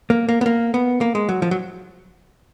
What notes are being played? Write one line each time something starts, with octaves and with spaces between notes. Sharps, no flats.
A#3
A#3
B3
A#3
B3
A#3
G#3
F#3
F3
F#3